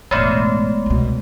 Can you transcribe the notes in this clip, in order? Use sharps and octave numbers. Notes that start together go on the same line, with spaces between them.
E1 A1 G#3 A3 B3
C2 B2